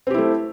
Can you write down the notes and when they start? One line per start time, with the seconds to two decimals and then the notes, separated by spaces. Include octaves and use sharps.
0.07 C4
0.11 G4
0.14 E4
0.18 A3